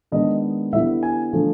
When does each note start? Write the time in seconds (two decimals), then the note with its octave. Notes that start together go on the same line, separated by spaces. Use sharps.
0.12 D#3 G#3 B3 D4 D#5
0.73 D3 G3 B3 E4 E5
1.03 G#5
1.33 D3 F3 A3